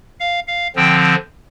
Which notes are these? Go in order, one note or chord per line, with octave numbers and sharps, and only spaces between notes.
F5
F5
D3 F3 C4 G5